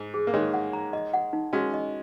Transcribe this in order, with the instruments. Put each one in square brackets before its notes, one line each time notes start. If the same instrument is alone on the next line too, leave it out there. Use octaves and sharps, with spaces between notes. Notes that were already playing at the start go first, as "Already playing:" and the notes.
Already playing: [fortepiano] G#2
[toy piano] G#4
[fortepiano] A#3
[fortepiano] D#3 G#3 [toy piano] C#5
[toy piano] F#5
A#5
D#5
F#5
D#4
[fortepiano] G#3 C#4 [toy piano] F#4
[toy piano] D#5